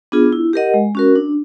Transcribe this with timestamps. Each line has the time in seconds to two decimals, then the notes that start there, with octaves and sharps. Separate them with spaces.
0.12 B3 D4 F4 G#4
0.33 E4
0.53 G4 A#4 D#5 F#5
0.74 G#3
0.95 C#4 F#4 A#4
1.16 D4